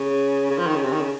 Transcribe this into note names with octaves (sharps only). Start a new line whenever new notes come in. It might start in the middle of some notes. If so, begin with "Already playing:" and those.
Already playing: C#3
C#3
F3
D#3
C#3
C3
D#3
C#3